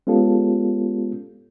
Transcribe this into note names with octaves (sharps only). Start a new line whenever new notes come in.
G#3 B3 C#4 F4 G4 A4